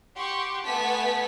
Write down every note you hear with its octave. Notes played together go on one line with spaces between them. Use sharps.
G4 F#5 C6 C#6
A3 B3 F#5 G#5 A5 B6